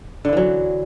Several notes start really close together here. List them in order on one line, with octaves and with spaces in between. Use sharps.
D3 E4 E3 F#3